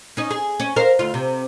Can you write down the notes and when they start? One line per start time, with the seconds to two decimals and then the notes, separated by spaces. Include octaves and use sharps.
0.17 C#4 D#4
0.31 G#4
0.60 C#4
0.76 A#4 C5 F5
0.99 D2 F4
1.14 C3